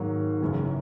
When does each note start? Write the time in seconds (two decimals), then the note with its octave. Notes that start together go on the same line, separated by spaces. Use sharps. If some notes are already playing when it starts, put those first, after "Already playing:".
Already playing: G#2 D#3 F#3 A#3
0.41 F#1 F#2 C#3 E3